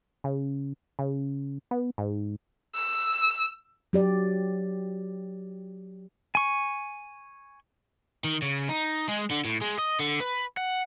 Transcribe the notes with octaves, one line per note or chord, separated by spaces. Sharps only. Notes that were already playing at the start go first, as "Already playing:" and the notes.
C#3
C#3
B3
G#2
E6
F#3 G4 D5
G#5 C#6
D#3
C#3
D#4
G#3
D3
A2
G#3
D#5
D3
B4
F#5